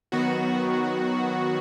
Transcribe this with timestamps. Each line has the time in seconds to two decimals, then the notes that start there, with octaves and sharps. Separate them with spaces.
0.12 D#3 F#3 B3 F#4
0.67 D#3 F#3 B3